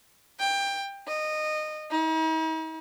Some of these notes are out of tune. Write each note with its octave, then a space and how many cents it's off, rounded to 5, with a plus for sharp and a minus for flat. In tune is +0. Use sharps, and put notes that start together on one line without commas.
G5 +20
D#5 -20
D#4 +45